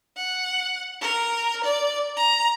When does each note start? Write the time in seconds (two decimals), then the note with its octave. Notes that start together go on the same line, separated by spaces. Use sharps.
0.17 F#5
1.01 A#4
1.64 D5
2.17 A#5